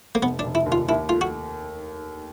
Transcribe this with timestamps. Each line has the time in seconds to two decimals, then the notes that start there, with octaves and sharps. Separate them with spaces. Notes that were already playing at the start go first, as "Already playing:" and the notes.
0.15 A#3
0.22 F1 B3
0.39 D4
0.44 F1
0.55 E4
0.66 D#2
0.72 F4
0.89 D#2 E4
1.09 A3 F4
1.21 F#4